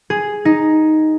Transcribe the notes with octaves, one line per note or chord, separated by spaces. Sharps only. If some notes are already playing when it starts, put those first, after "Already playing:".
G#4
D#4